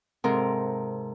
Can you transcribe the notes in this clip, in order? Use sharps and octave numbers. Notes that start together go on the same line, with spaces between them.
G#2 C3 A4 A#4